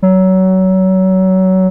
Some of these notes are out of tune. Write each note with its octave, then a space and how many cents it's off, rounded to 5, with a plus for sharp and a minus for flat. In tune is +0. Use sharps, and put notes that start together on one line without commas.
F#3 +25